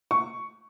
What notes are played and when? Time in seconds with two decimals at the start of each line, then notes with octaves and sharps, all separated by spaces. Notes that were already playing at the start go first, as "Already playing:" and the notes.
0.11 C#6